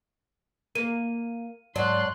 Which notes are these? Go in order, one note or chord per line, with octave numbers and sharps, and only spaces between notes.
A#3 D#7
G#2 F#3 D5 A5 C6 F#6